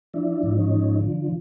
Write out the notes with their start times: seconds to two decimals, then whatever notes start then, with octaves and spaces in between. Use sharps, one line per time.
0.14 F3 D4 E4
0.43 G#2
0.57 C#4 D#4
0.72 F3
1.01 D3